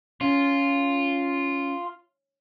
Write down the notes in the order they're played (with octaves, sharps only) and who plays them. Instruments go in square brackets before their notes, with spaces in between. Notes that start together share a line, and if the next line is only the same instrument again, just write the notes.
[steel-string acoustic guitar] C#4 [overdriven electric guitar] F4